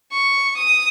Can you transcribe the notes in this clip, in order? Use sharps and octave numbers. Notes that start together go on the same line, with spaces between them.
C#6
D#6